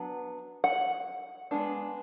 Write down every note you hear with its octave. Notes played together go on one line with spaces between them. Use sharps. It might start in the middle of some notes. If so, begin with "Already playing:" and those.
Already playing: F#3 B3 D4
F#5
G#3 B3 D4